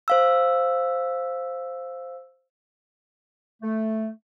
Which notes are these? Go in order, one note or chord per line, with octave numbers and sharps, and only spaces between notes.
C5 F5 E6
A3